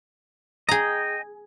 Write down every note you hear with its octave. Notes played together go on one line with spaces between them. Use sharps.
G#4 D#5 G5 A#5